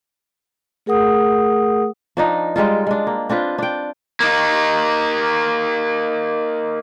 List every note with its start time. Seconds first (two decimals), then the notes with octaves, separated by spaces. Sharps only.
0.86 A3 G#4 A#4 F#5 D#6
2.17 F3 D4 D#4
2.56 G3 G#3 D#4 F4
2.87 G#3 D4
3.07 A#3
3.29 C4 D4 F4 B4
3.58 D4 G5
4.20 A#3 D#4